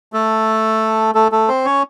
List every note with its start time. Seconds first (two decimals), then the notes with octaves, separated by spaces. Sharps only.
0.13 A3 A4
1.15 A3 A4
1.32 A3 A4
1.48 C4 C5
1.65 C#4 C#5